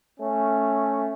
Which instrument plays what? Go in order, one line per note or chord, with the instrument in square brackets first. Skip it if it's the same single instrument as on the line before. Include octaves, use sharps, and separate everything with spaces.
[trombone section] A3 C#4